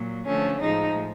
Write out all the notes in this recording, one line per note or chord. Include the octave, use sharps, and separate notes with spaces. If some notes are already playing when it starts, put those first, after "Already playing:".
Already playing: A#2 F#3
D3 F3 A3 C#4
A2 F3 G#3 D#4